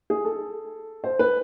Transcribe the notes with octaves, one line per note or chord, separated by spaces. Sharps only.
G#4
A4
C5
B4